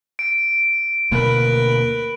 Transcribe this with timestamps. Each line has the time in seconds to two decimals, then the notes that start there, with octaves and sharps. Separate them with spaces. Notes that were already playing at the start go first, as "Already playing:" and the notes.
0.19 D7
1.11 D2 B2 A#3 A#4 B4